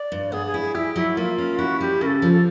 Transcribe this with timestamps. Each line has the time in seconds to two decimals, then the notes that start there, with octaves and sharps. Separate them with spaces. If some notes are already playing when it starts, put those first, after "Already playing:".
Already playing: D5
0.12 G2
0.32 B3 G#4
0.47 G#4
0.54 E4
0.61 G#4
0.75 E4 G4
0.96 F#3 E4
1.17 A#3 F4
1.38 C#4
1.59 E4 F#4
1.80 G3 G4
2.01 C#3 A#4
2.06 A4
2.22 F3
2.33 A4